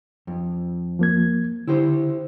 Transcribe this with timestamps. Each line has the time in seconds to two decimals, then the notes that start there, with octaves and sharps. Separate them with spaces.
0.27 F2
0.99 F3 A#3 G#6
1.68 D3 E4 G4 C5